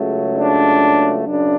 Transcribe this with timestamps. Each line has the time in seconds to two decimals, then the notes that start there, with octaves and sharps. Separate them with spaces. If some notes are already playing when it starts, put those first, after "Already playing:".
Already playing: C#2 C#3 F#3 A3
0.40 D4
1.27 F#2 C#3 D4